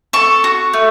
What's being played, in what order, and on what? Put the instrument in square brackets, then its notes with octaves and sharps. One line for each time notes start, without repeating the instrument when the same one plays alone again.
[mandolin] A4 C#6
F#4
A3